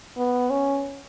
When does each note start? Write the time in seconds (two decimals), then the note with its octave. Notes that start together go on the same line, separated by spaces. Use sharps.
0.17 B3
0.50 C#4